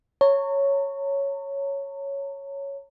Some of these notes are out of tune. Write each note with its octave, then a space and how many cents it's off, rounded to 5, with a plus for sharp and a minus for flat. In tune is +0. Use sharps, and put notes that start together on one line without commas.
C#5 +0 A#5 -40